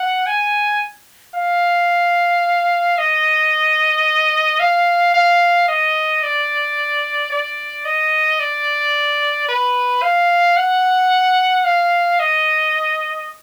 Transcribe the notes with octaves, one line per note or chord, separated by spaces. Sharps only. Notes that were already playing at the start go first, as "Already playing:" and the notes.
Already playing: F#5
G#5
F5
D#5
F5
F5
D#5
D5
D5
D#5
D5
B4
F5
F#5
F5
D#5